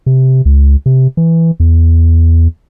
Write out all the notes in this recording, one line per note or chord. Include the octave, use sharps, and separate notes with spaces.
C3
C#2
C3
E3
E2